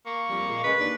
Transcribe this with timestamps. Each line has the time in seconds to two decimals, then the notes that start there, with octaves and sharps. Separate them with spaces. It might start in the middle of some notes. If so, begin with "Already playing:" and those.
0.06 A#3 C#6
0.29 F2 G3
0.48 A#2 G#3
0.64 C#3 G#3 B4
0.79 D#2 D4